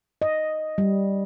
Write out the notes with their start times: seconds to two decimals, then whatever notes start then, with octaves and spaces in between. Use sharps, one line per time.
0.22 D#5
0.78 G3